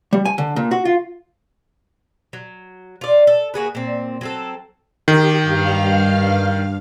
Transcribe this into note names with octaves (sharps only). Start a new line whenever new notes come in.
G3
G#5
D3
A#2
F#4
F4
F#3
F4 D5
A4
A#3 F#4 G#4 B4
A#2 C4
F#3 C4 A4
D#3 G4
G2 F5 F6